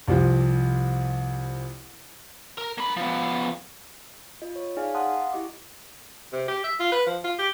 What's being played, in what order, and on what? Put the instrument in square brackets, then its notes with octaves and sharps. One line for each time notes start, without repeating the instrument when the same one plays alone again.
[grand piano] C2 C3 F3
[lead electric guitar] A#4
A#3 B5
F3 B3
[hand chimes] F4 D#5
C#5
D#4 G#4 D5 F5 G#5
F5 F#5 A5 C6 D#6 F#6
E4 G4 D#5 D6
[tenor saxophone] C3
G4
E5
F4
B4
F3
F4
G4